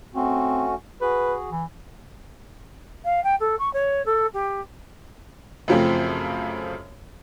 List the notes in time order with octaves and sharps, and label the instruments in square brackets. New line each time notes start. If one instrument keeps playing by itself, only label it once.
[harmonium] A3 C#4 F#4 [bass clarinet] C4
[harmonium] F#4 G#4 [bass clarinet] B4
[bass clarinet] E3
[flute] F5
G5
A4
C#6
C#5
A4
G4
[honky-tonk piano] F#2 C#3 F3 A3 C4